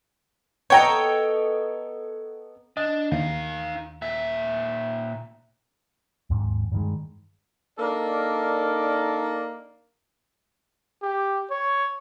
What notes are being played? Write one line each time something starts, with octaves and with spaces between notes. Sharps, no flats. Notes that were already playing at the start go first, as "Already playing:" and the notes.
B3 A4 C#5 D#5 G5 A#5
D4 D#5
D#2 D#4 F5
A#2 E5
D#2 G#2
G2 D#3 G#3
A#3 D4 D#4 A4 A#4 D5
G4
C#5